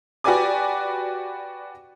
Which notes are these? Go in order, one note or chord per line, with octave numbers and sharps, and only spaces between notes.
F#4 G4 B4 D5 G#5 D6